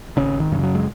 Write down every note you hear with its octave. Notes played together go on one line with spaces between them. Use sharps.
G#1 C#3 C#4
D#3
F#2 C#3
F#3
G#3